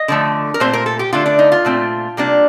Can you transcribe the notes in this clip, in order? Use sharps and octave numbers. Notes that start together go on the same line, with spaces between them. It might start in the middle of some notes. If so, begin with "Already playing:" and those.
Already playing: D#5
D3 F3 A3
A#4
A#2 A3 C4 C5
A#4
A4
G4
D3 A3 D4 F4
D4
D#4
F4
A#2 A3 C4
C3 G3 A#3 D4